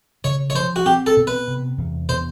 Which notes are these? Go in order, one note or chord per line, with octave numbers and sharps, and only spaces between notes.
C#3 C#5
C#5
F3 C5
F#4
C4 G4
A4
B2
B4
C3
E2
B2 C5